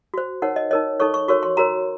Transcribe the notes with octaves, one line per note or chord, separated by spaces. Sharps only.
F#4 C5
D#4 A#4 C#5 F#5
D#5
D#4 A#4 C#5 D#5
D#4 A4 C#5 C#6
C#6
F#4 A#4 C#5 C#6
C6
F#4 A#4 C#5 A#5